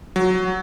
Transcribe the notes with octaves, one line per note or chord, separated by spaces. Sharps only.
F#3